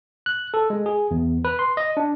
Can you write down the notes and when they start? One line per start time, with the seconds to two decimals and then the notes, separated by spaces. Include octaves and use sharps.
0.26 F#6
0.54 A4
0.70 G#3
0.86 G#4
1.11 E2
1.45 B4
1.59 C6
1.77 D#5
1.97 D4